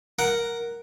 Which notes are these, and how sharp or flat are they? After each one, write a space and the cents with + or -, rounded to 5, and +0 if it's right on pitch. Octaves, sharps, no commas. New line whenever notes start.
A#4 +0 F#5 +0